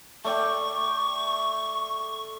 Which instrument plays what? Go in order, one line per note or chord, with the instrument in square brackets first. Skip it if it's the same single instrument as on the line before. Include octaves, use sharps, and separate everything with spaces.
[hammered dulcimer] A3 D5 G5 [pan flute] C#6